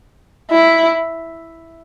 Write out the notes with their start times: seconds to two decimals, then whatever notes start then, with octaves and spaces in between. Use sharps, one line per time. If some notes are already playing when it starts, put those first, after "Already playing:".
0.51 E4